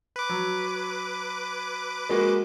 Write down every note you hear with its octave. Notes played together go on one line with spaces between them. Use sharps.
B4 D6
F#3
G#3 A#3 F#4